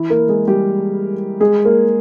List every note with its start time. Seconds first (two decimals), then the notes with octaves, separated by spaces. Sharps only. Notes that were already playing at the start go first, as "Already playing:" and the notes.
Already playing: E3 E4
0.10 A#3 A#4
0.29 G#3 G#4
0.48 G3 G4
1.40 G#3 G#4
1.65 A#3 A#4